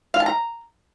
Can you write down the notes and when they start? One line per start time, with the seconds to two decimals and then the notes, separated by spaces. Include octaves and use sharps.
0.14 F5
0.20 A5
0.26 A#5